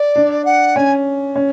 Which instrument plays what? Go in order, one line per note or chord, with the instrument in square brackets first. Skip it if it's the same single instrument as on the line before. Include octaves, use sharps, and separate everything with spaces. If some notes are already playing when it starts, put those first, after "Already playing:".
Already playing: [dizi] D5
[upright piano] D4
[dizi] F#5
[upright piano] C#4 [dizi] G#5
[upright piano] C#4